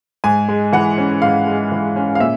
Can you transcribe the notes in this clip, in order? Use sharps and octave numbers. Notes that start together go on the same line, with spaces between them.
G#2 G#5
G#3
E3 F#5
C#4
G#2 F5
G#3
E3
C#4
F5
A#2 E5